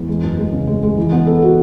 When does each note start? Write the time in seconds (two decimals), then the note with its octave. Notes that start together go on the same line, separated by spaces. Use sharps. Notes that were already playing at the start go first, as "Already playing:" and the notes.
Already playing: E2
0.08 G#3
0.23 F#2
0.38 G#3
0.52 C#3
0.67 G#3
0.83 G#3
0.97 E3
1.12 B3
1.27 A4
1.42 F#4